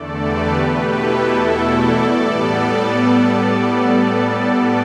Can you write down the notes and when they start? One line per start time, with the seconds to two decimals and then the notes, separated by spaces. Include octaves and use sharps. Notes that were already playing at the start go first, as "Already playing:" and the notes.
Already playing: E2 D3 A3 A4 D5
0.18 G4 B4
0.55 B2 A3 G4 B4
0.93 E4 A4
1.30 E2 B2 A3
1.67 A4 D5
2.05 A2 G3 B3